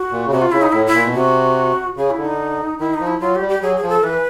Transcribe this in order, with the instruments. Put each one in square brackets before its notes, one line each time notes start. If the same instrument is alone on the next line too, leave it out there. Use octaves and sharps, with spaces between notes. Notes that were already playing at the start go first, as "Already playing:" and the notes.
Already playing: [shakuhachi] F#4
[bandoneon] A#2
C#3
[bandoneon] C3 [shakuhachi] F#4
[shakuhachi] F4
[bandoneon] C#3 [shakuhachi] E4
[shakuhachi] D#4
[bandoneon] A2 [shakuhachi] E4
[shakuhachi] E4
[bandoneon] A#2
B2
[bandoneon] C3 [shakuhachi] F#4
[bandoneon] C#3 [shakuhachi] G#4
[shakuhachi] E4
[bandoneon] D3
[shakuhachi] D#4
[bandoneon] D#3 [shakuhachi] E4
[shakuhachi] D#4
[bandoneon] F3
[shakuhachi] E4
[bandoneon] F#3 [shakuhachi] F4
[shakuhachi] G4
[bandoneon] G3
[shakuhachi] G4
[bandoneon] F#3 [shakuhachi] G#4
[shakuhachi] G#4
[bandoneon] F3
[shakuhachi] A4
[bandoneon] E3 [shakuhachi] B4